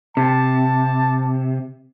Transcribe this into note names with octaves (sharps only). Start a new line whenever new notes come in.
C3 A5